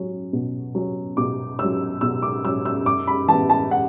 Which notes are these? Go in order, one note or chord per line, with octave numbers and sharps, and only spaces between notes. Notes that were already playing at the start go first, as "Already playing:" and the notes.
Already playing: F#3 C#4
B2
F#3 C#4
B2 D6
C#4 E6
F#3
B2 E6
D6
F#3 C#4 E6
E6
F#2 D6
B5
E3 B3 A5
A5
F#5